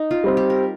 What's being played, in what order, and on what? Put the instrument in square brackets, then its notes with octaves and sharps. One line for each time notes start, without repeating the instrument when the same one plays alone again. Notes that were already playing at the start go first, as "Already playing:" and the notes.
Already playing: [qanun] D#4
F4
[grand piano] G3 C4
[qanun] G4
A#4